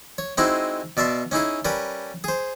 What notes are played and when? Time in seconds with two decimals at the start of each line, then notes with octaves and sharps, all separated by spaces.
0.18 C#5
0.38 G#3 C4 D#4 E4 F#4 G#4
0.97 B2 D5 E5 A5 C6
1.31 C#4 D#4 E4 G#4
1.65 G3 C#4 A#4 B4
2.24 G#4 C5